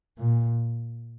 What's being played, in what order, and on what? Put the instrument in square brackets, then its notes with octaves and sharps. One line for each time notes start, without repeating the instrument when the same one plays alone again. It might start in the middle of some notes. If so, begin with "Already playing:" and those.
[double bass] A#2